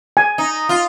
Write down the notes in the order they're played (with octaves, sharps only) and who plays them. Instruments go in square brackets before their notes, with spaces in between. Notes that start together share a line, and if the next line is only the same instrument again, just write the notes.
[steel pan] G#5
[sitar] D#4
F4